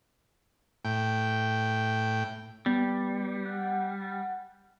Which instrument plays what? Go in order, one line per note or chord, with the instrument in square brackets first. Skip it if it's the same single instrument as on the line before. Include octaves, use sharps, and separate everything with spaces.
[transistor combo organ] A2 G5
[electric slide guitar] G3 [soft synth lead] B3
[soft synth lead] F#5